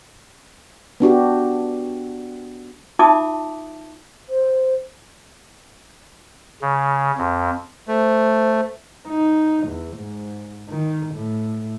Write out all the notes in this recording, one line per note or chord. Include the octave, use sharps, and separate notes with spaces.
B3 D4 F#4 G4
D#4 F4 E5 A5 D6 D#6
C5
C#3
F2
A3 C5
D#4
E2
G#2
D#3
A2